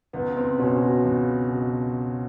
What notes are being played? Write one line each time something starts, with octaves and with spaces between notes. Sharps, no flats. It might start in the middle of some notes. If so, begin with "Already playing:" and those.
C#2 B3
C4
B2 C#4
F#4
C#2
B2